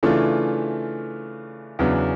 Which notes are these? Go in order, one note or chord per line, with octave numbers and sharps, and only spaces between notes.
C#3 E3 A3 D4 F4
E2 C#3 F#3 B3 D4